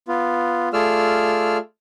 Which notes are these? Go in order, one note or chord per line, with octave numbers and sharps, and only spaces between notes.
B3 F4
A3 F4 G#4 D5 E6 F6